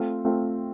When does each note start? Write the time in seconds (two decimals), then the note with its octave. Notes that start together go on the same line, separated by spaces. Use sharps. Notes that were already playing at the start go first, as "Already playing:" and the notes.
Already playing: A3 C4 F4
0.25 A3 C4 F4